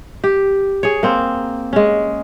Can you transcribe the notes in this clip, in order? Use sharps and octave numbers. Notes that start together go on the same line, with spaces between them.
G4
G#4 C#5
A#3 C4
G#3 C#4